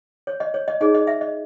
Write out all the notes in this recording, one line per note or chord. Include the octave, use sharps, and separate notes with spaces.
C#5
D#5
C#5
D#5
D#4 G#4 C#5 D#5
D#5
E5
D#5